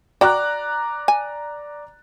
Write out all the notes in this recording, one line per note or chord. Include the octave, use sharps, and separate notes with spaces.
F#4 D5 G5 A#5 F#6
G#5